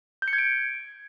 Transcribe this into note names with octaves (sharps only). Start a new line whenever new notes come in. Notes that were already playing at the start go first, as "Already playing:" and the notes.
G6
C#7
G#6
D7